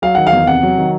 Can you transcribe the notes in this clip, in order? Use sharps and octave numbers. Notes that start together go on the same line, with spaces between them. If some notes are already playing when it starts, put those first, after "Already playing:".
F#3 F5
D#3 F#5
F5
E2
C3 F#5
F#3
D#3